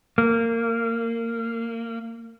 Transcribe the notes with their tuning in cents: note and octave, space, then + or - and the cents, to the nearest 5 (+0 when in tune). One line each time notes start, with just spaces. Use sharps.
A#3 -20